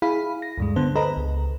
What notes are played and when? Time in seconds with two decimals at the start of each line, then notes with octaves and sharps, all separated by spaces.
0.02 E4 G#4 F5 B5
0.42 A#6
0.58 D2 G2 G#3
0.76 D3 B3 C5
0.96 A4 B4 C5 D#5 A#5 B5
1.17 C#2